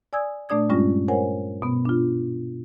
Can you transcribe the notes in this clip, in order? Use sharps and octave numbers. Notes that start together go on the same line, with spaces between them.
D5 G#5 D#6 E6 G#6
A#2 A3 D4 D5 D#6 G#6
G2 G3 G#3 C#4 F4 A#6
A#4 C5 C#5 F#5 G#5
B2 B3
D4 F4